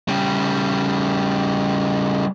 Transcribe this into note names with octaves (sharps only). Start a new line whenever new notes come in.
C#3 G3